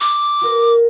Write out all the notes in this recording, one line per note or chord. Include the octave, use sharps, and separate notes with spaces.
D6
F#4 A#4 B4